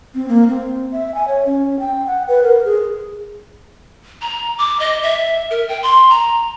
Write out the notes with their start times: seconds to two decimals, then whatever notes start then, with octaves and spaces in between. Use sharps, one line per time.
0.15 C4
0.28 A#3
0.49 C4
0.92 E5
1.15 G#5
1.28 C#5
1.46 C#4
1.80 G5
2.07 F#5
2.28 B4
2.43 A#4
2.65 G#4
4.22 A#5
4.58 D6
4.80 D#5
5.03 E5
5.51 A#4
5.68 G5
5.83 C6
6.10 A#5